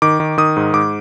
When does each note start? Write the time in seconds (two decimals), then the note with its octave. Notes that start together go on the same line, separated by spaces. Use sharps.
0.02 D#3 D6
0.20 D#3
0.38 D#3 D#6
0.57 G#2
0.74 G#2 D6